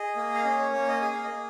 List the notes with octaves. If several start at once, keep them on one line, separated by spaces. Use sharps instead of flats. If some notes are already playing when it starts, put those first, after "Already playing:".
Already playing: G#4 D#5
A#3
F5
C#4 D#5
C#5
A#3 C#5
D#5
G#4 G#5
F5
D#5
A#3